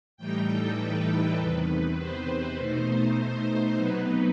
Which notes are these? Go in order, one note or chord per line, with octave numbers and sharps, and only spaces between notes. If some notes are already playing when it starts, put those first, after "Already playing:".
A2 E3 G3 D#4 G5
A4
B4
A4
E2 C3 D#3 B4
C5
B2 A3 D#4
C3 F#3 B3 D#4 B4